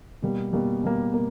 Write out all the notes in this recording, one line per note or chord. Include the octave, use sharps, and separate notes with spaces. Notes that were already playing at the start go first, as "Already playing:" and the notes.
B2 G3 A#3
B2 G3 A#3
B2 G3 A#3
A#3